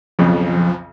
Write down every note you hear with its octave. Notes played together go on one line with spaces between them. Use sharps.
B1 F2 C#3 F3